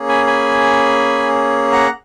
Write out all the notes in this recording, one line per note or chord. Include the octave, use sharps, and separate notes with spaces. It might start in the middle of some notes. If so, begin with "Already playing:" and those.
Already playing: A#3 C#4 G#4
G#5 B5
G#5 B5
F#5 A#5